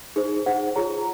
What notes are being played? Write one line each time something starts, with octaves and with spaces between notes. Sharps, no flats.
D#4 G#4 C5
D#4 G#4 C5 F#5
F4 G#4 C#5 A#5